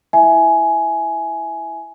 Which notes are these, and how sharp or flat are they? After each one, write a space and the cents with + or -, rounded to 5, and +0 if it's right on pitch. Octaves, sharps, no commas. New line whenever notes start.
E4 +0 E5 +0 G#5 +15